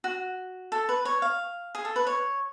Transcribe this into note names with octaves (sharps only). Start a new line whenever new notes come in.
F#4
A4
B4
C#5
F5
G#4
A4
B4
C#5